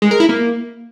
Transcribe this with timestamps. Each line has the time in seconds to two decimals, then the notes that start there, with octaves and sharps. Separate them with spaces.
0.02 G#3
0.11 A#4
0.20 E4
0.29 A#3